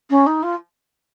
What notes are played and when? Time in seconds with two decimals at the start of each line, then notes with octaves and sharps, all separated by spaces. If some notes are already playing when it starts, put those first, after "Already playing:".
0.10 C#4
0.27 D#4
0.43 F4